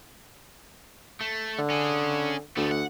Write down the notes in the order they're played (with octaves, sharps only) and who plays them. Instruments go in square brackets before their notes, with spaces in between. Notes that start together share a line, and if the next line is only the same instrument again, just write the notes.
[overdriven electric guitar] A3
[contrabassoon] D3
[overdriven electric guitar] C#4 G#4
[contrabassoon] D2 [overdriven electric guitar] A3 B3
[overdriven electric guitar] F#5